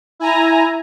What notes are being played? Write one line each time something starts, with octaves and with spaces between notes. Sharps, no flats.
E4 G#5 A#5